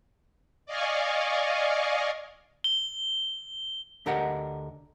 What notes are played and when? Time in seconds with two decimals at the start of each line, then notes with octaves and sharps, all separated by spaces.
0.66 D5 D#5 F5 G#5 C#6
2.64 G7
4.06 D2 D3 G4 A#4 D#5 F#5